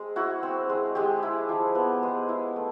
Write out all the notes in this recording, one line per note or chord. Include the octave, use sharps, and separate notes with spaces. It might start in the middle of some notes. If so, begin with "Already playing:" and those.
Already playing: G#3 C4
E4 F#4
C4
G#3
G#3 G4
E4
F3
B3
G#3
E4
A3